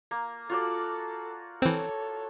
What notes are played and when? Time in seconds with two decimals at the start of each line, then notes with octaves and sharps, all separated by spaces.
0.11 A#3
0.50 F4 F#4 A4 D5
1.62 E3 C4 A4 C#5